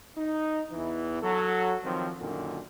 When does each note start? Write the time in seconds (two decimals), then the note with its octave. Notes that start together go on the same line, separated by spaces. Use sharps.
0.17 D#4
0.72 E2 E3
1.22 F#3 A4
1.84 D#3 F3 F#3 C4
2.20 F#2 A#2 D3 D#3